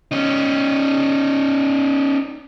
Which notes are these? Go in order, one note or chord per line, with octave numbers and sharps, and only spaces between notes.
C#4 D#4